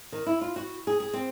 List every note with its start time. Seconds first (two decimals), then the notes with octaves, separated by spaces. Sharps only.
0.12 D#3
0.26 E4
0.41 F4
0.56 F#4
0.87 G#4
1.00 G#4
1.13 C4